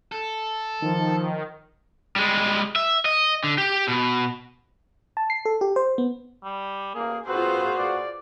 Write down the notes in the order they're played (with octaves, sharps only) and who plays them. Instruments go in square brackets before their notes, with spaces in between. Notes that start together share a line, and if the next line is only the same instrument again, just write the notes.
[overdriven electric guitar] A4
[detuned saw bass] D#3 [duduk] F3
[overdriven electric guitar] G3 G#3
E5
D#5
D3
G4
B2
[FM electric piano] A5
C7
A4
G4
C5
B3
[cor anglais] G3
[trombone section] A1 A#3 [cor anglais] G#4
[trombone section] A#2 F#4 [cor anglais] C4 [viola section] F4 B4 [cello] G#4 C5
[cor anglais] D5